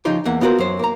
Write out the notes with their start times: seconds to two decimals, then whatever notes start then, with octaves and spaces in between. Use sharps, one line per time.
0.05 C#3 F3 D#4 F4 G4
0.25 E2 A#3 F#5
0.41 B3 F4 F#4 A#4 C5
0.58 F#2 F#3 C5
0.79 A#3 A#5